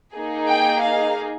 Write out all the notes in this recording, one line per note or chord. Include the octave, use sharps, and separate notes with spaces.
A#3 D#4 G#4
G5
F5